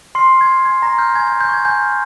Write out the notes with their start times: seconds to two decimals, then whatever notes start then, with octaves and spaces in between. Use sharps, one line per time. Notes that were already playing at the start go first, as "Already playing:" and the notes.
0.15 C6 F6 C7
0.32 F6
0.41 G#6
0.49 F6
0.65 G#5 G#6
0.82 A#5 C#6 A#6
0.98 F6 G6
1.16 G#5 G#6
1.28 G6
1.32 G#5
1.40 G6
1.48 C#6 G#6
1.65 G#5 G6
1.83 F6